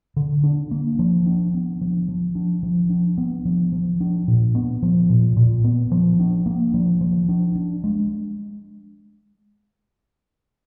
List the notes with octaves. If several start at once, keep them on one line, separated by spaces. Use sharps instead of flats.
D3
D4
A#3
F3
D4
B3
F3
F3
D4
F3
D4
B3
F3
F3
D4
A#2
B3
F3
A#2
A#2
B3
F3
D4
A#3
F3
F3
D4
D4
G#3